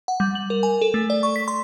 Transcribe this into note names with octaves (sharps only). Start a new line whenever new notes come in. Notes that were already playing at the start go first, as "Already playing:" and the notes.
F#5
G3
F#7
A#4
G#5
A4
A3
D5
C#6
B6
C6